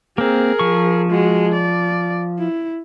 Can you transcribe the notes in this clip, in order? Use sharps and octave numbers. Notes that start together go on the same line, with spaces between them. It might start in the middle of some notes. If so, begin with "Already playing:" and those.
A#3 C4 G#4 A#4
F3 C#6
G#3 F#4
D5
E4